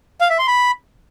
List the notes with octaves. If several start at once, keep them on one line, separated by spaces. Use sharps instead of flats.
F5
E5
C6
B5